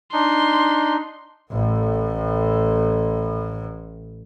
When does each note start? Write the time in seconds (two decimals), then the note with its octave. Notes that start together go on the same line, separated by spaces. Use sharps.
0.13 D4 D#4 C6
1.52 A1 A2